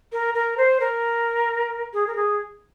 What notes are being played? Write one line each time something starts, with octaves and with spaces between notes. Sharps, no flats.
A#4
A#4
C5
A#4
G#4
A#4
G#4